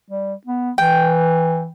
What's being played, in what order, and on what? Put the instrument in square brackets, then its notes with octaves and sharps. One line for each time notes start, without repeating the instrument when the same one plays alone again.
[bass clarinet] G3
B3
[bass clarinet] E3 [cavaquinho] G5